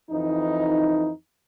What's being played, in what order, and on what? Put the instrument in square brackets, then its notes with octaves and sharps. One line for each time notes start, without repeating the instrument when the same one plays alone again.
[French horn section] F2 E3 D#4